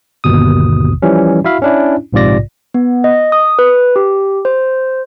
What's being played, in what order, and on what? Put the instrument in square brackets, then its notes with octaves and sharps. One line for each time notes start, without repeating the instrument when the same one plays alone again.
[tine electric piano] G1 D#2 B2 D#6
E3 F3 G3 C#4
E4 F#4 E5 F5 B5
C#4 D4 E4
A#1 G#2 C3 F4 D5 A#6
[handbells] B3
D#5
D#6
B4
G4
C5